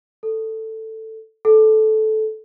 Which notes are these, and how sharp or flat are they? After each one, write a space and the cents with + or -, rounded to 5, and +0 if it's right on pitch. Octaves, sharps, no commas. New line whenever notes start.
A4 +10
A4 -15